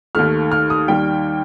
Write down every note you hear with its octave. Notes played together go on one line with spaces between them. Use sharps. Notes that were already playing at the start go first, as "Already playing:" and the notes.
D#2 D#3 A3 F6
F6
D#6
D#2 D#3 G3 G5